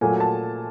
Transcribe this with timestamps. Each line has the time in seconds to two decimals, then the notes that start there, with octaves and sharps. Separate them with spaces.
0.01 A#2 F#3 A3 G#5
0.20 A5